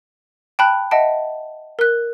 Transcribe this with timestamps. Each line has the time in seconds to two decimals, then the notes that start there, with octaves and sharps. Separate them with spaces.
0.59 G5 A5 B5 F#6
0.91 D#5 E5 F#5 A5 D7
1.79 A#4 F#6